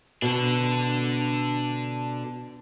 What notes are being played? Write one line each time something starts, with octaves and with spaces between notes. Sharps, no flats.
B2 D4 A4